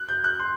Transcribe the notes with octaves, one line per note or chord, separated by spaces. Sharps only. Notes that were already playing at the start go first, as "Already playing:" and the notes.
Already playing: F#6
G6
F#6
C6